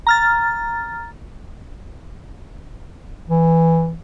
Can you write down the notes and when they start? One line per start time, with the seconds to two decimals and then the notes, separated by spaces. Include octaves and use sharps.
0.07 A#5 F6 A6
3.29 E3